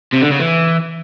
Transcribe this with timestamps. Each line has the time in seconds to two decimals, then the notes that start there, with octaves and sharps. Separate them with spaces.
0.13 C3
0.22 D3
0.31 C#3
0.39 E3